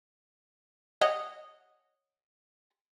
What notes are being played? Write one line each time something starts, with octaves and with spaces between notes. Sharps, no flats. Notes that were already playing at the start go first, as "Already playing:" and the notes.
C#5 D#5 F#5